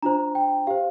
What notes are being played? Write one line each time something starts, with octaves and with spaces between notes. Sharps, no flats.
D4 F4 C5 A#5
G5
G4 C5 F5